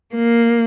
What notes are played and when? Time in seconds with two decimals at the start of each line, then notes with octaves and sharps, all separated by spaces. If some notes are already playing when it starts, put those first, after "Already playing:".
0.15 A#3